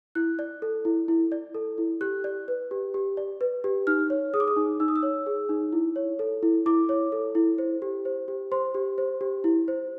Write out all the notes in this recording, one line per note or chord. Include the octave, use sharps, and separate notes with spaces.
E4 F#6
D5
A4
E4
E4
D5
A4
E4
G4 F#6
D5
B4
G4
G4
D5
B4
G4
D#4 F6
C#5
G#4 D#6
D6
D#6
D#4
D#4 E6
D#6
E6
C#5
G#4
D#4
E4
C#5
A4
E4
E4 D6
C#5
A4
E4
C5
G4
C5
G4
C5 C6
G4
C5
G4
E4
C5